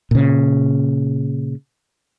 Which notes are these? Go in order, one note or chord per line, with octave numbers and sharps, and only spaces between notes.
A#2 C#3